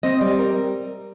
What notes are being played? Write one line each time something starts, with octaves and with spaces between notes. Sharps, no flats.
C4 D#5
G3 D5
A#4